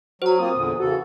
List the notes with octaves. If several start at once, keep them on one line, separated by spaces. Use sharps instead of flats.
F#3 F#4 C5 A#5
A#3 C4 F4 D#6
E2 A#2 D3
C#3 E3 F#4 A4